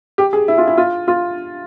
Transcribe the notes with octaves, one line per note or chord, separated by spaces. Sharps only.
G4
G#4
E4
F4
E4
F4
F4